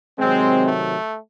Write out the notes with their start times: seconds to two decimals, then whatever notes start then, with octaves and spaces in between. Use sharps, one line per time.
0.19 C3 D#3 F#3 G#3 C4
0.66 A3